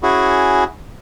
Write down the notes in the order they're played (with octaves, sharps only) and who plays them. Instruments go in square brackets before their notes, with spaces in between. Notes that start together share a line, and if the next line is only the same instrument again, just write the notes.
[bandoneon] C#4 E4 F#4 G#4